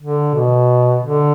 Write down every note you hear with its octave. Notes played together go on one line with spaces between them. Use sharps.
D3
B2
D3